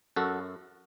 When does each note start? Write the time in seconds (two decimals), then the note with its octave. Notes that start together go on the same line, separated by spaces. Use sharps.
0.16 F#2 F#4 A4